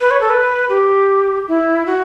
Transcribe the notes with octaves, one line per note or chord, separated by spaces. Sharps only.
B4
C#5
A4
B4
G4
E4
F#4